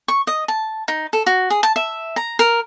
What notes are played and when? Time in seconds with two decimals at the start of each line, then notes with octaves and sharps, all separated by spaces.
0.08 C#6
0.27 D#5
0.48 A5
0.88 D#4
1.13 A4
1.26 F#4
1.50 G#4
1.63 A5
1.76 E5
2.16 A#5
2.39 A#4